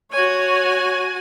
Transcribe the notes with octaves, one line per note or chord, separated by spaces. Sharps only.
F#4 C#5 G#5